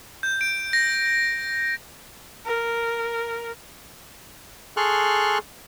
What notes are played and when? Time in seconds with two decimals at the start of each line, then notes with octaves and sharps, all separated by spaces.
0.23 G6
0.41 D7
0.73 A#6
2.45 A#4
4.77 G#4 A4 C6 C#6 F6 F#6